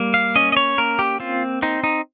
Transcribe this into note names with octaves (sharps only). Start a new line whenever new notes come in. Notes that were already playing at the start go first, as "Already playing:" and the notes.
Already playing: G3 A#3
F5
C#4 D#5
D#5
C#5
A#3 A#4
G4
C4 F4
C4 D#4
D#4